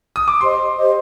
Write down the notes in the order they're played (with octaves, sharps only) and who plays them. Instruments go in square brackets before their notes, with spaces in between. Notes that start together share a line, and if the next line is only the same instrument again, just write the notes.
[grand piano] D#6
D6
[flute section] G4 C5 D#5 [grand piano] C6
[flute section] G4 C5 D#5